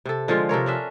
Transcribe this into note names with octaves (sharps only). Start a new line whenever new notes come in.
C3 A4
D3 F3 G#3 F4
C3 A4 A#4 C#5
C#4 D4 E5